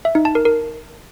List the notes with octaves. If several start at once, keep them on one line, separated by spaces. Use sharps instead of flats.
E5
D#4
A5
A#4
A#4